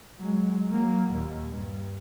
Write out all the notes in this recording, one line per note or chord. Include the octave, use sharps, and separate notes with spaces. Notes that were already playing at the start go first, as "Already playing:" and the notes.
F#3 G#3
F#3 A#3
D#2 A#2
G2